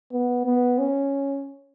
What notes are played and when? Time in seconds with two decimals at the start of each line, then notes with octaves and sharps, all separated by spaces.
0.12 B3
0.45 B3
0.79 C#4